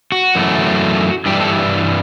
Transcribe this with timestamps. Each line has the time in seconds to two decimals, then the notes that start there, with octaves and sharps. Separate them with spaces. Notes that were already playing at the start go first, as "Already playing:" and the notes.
0.12 F#4
0.35 F#2 E3 A3
1.26 G2 E3 G3 G4
1.41 A4